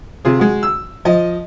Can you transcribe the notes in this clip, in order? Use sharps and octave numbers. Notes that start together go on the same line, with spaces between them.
C3 F4 G#4
G#3 F#4
E6
F3 D#5